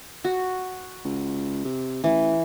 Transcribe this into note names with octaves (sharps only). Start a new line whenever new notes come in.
F#4
C#2
C3
A1 E3